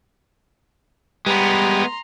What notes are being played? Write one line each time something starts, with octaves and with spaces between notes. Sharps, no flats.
G3 G#3 B3 G4 B4 A#5 C6